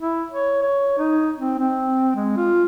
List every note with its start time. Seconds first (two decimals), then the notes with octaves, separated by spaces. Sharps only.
0.01 E4
0.31 C#5
0.62 C#5
0.98 D#4
1.39 C4
1.58 C4
2.15 G#3
2.37 F4